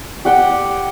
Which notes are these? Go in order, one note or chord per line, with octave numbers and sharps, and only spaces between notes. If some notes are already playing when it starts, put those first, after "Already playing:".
G4 F#5 G5